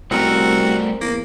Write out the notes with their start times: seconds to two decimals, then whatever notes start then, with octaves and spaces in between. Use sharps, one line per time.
0.11 C2 G3 A3 C4 F#4 A#4 A#5
1.01 E2 A#3